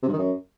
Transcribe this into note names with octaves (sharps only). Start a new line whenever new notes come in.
C3
G2
D#3
F#2